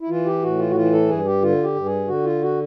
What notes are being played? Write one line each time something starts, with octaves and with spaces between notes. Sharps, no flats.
E4
E3 F4
G4
A2 F#4
F4
F#4
E3 F4
A4
G2 G#4
G4
D3 F4
G4
G2
G#4
D3 F#4
F4
F#4